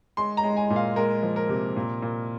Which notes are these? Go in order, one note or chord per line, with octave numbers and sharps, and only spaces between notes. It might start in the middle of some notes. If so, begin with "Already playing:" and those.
G#3 C6
A#5
G#3
G#5
A#2
F5
G#3 A#4
F3
A#4
C3
A#2
A#2